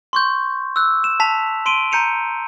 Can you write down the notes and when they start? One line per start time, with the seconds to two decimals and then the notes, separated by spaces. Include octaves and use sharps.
0.13 C6 C#6 G6
0.76 E6 F#6
1.04 E7
1.20 A5 B6 F7
1.66 C6 D7 D#7 G7
1.91 A#5 G6 C#7 D#7 F7